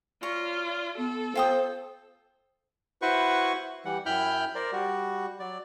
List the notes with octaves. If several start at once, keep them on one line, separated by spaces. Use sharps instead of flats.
F4 C#5 D5 A#5
B3 A4
F4 C5 G5 D#6
E4 F#4 B4 C5 C#6
E3 G3 F#5
F#2 E4 G5 B5 F6 G6
A#4 C5 D5
G3 F#4
F#3 D5